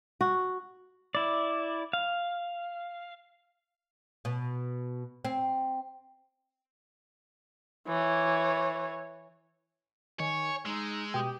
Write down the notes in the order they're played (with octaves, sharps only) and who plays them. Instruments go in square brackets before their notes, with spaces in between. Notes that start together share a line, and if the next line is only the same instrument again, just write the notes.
[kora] F#4
[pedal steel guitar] E4 D5
F5
[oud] B2
C4
[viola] E3 C#5
[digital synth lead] D#3 [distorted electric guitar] C#5 [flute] G#5
[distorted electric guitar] G#3 [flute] D#4 [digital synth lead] E6
[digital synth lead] B2 [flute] G4 [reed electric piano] G5 D#6